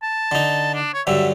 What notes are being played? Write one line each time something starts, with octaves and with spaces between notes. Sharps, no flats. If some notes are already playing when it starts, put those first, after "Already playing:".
A5
D3 D#4
D4
C#5
G2 D3 F#3 E5